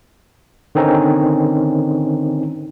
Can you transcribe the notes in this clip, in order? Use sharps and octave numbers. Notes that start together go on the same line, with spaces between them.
D3 D#3 C4 C#4 D#4